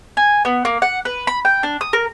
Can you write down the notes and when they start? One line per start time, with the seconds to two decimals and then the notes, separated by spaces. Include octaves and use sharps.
0.17 G#5
0.45 B3
0.65 A#3
0.82 F#5
1.05 B4
1.27 B5
1.45 G5
1.63 D4
1.81 D#6
1.93 A#4